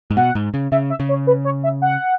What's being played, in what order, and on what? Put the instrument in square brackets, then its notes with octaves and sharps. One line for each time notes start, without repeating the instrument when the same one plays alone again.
[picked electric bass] G#2
[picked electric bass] B2 [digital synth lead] F#5
[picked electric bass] G#2
C#3
[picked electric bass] C#3 [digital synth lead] E5
[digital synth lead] E5
[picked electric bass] C#3
[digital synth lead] C#5
B4
C#5
E5
F#5